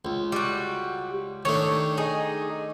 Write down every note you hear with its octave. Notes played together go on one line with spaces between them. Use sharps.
C#2
G3 F#4
D#3 A3 D4 C#5
D#4 G#4